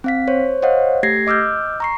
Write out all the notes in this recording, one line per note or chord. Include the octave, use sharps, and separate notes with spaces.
C4 F5 B6
C5 C#5
C5 C#5 D#5 F5 F#5
A3 G4 G#6 A#6 C7
D#5 D6 E6 F6 G6
A#5 C#6 C7